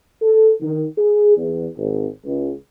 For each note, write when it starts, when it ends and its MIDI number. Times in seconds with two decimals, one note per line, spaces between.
0.21 0.50 69
0.61 0.84 51
0.97 1.35 68
1.37 1.67 40
1.78 2.07 32
2.25 2.52 37